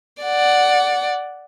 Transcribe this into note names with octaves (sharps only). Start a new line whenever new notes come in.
D5 F#5